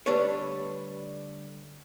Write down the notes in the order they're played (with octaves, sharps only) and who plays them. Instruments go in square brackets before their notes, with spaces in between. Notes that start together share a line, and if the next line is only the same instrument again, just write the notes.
[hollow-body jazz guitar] D3 G3 A3 D4 B4 C#5